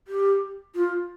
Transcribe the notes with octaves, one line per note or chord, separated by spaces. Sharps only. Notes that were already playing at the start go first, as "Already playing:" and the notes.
G4
F4